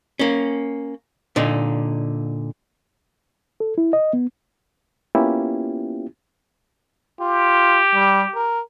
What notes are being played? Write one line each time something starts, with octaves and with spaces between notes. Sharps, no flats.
A#3 C#4
A#2 D3 D#4
A4
E4
D#5
B3
A#3 B3 C#4 E4 F4 G4
F4 G4
G3
A#4